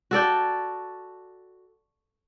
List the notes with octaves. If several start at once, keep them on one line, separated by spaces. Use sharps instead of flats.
F#4 A4 D5 G5